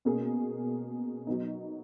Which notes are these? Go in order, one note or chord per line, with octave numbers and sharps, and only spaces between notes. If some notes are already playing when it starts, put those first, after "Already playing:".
B2 A#3 C#4 G#4
F#3 B3 D#4